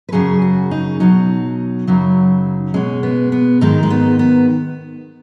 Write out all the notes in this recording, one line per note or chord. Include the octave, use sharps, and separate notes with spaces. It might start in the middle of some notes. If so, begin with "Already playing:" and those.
B4
F#2 C#3 F#3 G#4
F#4
D#4
B2 F#3 D#4
F#2 C#3 F#3
B2 G#3 C#4
B3
B3
G#2 D#3 G#3 D#4
G#3
B3
B3